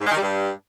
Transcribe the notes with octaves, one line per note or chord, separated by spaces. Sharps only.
G#2
G#3
D#3
G3
G2